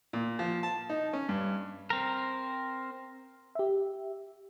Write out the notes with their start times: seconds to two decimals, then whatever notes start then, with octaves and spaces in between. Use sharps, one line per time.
0.13 A#2
0.39 F3
0.63 A5
0.90 D#4
1.13 C#4
1.29 G2
1.90 C4 A#4
3.55 G4 E5